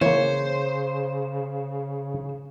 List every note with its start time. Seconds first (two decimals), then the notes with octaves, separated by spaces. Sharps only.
0.01 C#3 E3 A#3 C5 C#5